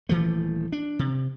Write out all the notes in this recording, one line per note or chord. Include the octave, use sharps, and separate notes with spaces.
D#1 E3 F3 A3
D4
C3